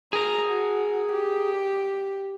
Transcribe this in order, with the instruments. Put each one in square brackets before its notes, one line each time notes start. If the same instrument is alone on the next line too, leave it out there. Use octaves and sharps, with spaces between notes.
[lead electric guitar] G#4 A#4 [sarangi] A#5
[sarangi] F#4
G4